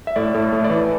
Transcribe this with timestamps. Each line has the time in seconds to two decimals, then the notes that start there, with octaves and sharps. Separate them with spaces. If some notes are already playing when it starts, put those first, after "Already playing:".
0.07 E5
0.16 A2 D5
0.34 A2
0.52 A3
0.64 D5
0.70 E3